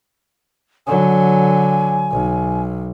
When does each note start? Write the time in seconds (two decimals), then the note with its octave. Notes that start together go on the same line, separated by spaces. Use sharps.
0.87 D3 F#3 G#5
2.11 B1